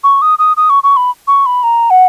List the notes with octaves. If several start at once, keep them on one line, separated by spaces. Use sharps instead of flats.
C#6
D#6
D#6
D#6
C#6
C#6
B5
C#6
B5
A#5
F#5